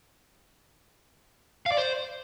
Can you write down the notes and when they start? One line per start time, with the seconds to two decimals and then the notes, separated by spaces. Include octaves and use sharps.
1.66 F5
1.72 D5
1.77 C5